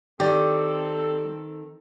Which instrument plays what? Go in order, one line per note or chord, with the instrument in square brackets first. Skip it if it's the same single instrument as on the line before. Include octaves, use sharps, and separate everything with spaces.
[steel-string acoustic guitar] D#3 [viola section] C4 A4 [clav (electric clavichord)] G4 D5